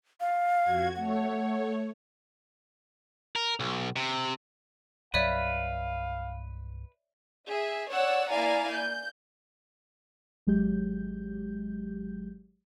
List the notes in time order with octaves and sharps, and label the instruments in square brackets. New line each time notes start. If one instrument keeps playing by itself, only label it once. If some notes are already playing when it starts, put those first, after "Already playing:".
[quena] F5
[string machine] F2 F#4 G#6
[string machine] A3 C#5 [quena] F#5
[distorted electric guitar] A#4
B1
C3
[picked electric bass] C2 G2 F#3 [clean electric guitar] B4 [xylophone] C#5 D5 E5 [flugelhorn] F5
[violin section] G#4 E5
C#5 D5 F#5 E6
A#3 E4 D5 F5 G#5 A#5
G6
[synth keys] G#1 F#3 G#3 G4 G6